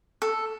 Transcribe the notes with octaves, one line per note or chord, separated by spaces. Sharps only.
A4